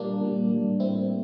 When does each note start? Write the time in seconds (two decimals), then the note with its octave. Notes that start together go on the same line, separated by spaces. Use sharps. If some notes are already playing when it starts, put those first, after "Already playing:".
Already playing: A#2 G3 A#3 D4
0.21 A#2 G3
0.51 A2 G3
0.80 A2 G3 C4 E4